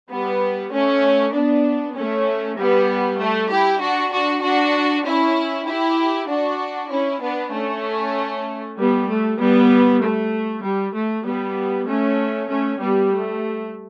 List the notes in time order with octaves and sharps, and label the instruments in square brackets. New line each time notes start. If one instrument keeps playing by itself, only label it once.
[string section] G3 B3
A3 C#4
B3 D4
A3 C#4
G3 B3
A3
E4 G4
D4 F#4
D4 F#4
D4 F#4
C#4 E4
E4 G4
D4 F#4
C#4 E4
B3 D4
A3 C#4
G3 B3
A3
G3 B3
A3
G3
A3
G3 B3
A3 C#4
A3 C#4
G3 B3
A3